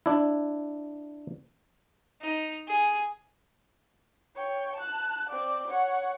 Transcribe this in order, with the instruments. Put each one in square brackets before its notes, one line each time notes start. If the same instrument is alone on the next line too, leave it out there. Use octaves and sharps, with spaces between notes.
[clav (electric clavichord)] D4 E4
[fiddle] D#4
G#4
[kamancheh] C#5 G5
A5 F#6
C4 D5
C#5 F#5